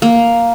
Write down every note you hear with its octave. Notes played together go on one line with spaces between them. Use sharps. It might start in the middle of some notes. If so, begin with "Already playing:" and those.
A#3